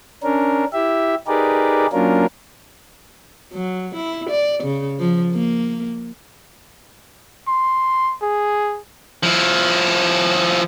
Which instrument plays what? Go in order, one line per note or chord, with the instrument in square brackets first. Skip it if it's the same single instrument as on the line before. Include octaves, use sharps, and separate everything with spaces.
[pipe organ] C#4 D4 A#4
E4 G4 E5
D#4 G4 G#4 A#4 B4 D5
F#3 A#3 C#4 D4 F4 A#4
[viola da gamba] F#3
E4
D5
C#3
F3
A#3
[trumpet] C6
G#4
[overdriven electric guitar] F3 E4